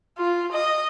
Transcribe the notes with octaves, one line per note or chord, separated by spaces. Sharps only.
F4
D#5